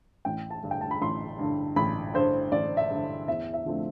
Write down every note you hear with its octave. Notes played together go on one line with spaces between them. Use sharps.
A1 G5
A5
G2 D3
G5
A5
B5
A1 C6
G2 D3
A1 B5
G2 D3 C5
A1 D5
E5
G2 D3
E2 E5
E5
D3 F3 A3 C4